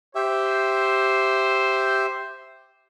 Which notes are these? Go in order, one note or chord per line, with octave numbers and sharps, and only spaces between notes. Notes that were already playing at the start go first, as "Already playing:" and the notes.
G4 C5 E5